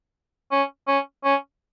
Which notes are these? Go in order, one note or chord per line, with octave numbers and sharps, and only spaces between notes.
C#4
C#4
C#4